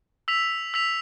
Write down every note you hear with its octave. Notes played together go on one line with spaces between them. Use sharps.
E6 B6 F7
E6 B6 F7